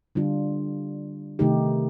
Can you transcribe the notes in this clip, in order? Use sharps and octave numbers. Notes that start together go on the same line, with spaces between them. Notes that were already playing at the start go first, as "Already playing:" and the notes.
D3 G3 D4 F4
C3 D#3 A3 D#4 G4